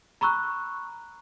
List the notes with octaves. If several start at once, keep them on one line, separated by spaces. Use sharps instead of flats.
A#5 B5 C#6 E6 F#6